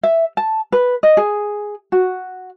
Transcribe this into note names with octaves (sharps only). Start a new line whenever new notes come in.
E5
A5
B4
D#5
G#4
F#4